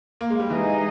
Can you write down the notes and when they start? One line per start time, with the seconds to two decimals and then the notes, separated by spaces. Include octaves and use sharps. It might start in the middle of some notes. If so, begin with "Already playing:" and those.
0.21 A#3
0.30 G#3
0.40 G3
0.50 E3 G#3 D#4 G#4 D#5